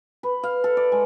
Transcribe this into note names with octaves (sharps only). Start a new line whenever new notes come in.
B4
F5
A4
D5
G#3